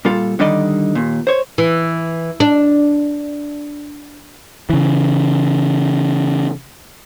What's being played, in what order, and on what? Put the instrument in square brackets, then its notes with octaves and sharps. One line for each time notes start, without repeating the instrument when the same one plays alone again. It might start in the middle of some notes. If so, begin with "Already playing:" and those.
[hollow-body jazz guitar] A#2 G3 F4 A4
D3 D#3 G3 D#4 D5 D#5
D#2 A#2
C5 C#5
[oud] E3
D4
[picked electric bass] C#3 E3